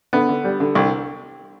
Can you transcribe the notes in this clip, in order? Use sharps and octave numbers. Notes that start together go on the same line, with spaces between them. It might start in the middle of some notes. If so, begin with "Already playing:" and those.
D3 B3
D3
G3
D3
C2